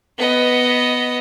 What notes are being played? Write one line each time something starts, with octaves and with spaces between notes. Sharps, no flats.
B3 D#5